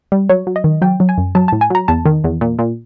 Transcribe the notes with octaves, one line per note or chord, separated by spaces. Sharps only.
G3
F#3 C#5
F#3
D#5
D#3
F#3 G5
F#3
G#5
F#2
F#3 A5
A2 A5
G#5
F#3 A#5
E2 A5
D#3
E2
A#2
A#2